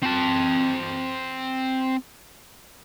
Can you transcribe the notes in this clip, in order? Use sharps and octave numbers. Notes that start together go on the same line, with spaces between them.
C4 A5